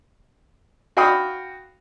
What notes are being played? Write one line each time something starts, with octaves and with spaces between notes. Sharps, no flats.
F#4 F5 G5 B5 D#6